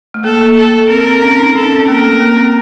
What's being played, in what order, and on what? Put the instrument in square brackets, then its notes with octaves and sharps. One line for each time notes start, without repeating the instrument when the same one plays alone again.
[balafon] A3
[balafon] A#3 [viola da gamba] A4
[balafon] A#3
[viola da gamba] A4
[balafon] C4 [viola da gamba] A#4
[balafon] C4
C#4
D#4
[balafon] D#4 [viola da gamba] A4
[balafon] C#4
C4
C#4
[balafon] A#3 [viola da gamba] A#4
[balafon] A3
A#3
C4